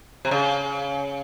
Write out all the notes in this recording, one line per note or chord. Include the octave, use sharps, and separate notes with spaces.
C3
C#3